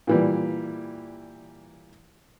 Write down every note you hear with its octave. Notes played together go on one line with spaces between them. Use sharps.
A#2 E3 G3